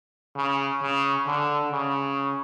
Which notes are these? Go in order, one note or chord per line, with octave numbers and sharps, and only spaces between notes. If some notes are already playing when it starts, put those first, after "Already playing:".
C#3
C#3
D3
C#3